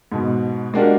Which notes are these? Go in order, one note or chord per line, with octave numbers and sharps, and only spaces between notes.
G#2 B2
G#3 A#3 D4 F#4 G4